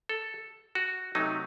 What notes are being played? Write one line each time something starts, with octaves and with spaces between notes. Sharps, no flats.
A4
F#4
C3 F#3 A3 D#4